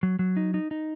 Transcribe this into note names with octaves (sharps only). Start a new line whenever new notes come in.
F#3
F#3
D#4
D#4
D#4